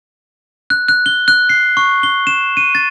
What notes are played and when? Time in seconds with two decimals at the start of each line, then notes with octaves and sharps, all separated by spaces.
0.70 F#6
0.89 F#6
1.06 G7
1.28 F#6
1.49 C7
1.77 C#6
2.03 G7
2.27 E7
2.57 D#7
2.75 A6